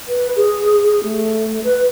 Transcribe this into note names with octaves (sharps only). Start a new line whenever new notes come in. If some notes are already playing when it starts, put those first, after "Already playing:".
B4
G#4
A3
B4